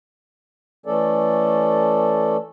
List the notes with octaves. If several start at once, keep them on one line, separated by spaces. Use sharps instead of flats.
E3 A3 C#4 A4 D5